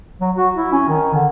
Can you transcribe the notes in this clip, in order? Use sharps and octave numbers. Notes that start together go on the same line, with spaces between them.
F#3
F#4
E4
C#4
D#3
D3